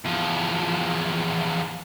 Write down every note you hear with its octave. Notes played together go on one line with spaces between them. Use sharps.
E2 F3